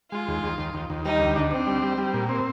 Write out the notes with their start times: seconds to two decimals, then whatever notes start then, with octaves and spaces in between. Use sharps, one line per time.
0.11 G#3 F4
0.28 D#2
0.43 D#2
0.58 D#2
0.74 D#2
0.90 D#2
1.05 G3 D#4
1.20 D2
1.36 D4
1.51 C4 D4
1.66 G3
1.82 G3
1.97 G3
2.14 A#2
2.29 C4